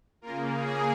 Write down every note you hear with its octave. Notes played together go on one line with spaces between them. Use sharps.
C#3 A#3 F4 A#4
G#4